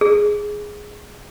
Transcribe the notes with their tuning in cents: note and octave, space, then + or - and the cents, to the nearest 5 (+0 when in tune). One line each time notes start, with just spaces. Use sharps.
G#4 +0